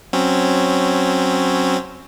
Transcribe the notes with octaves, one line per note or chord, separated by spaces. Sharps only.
F#3 C4 C#4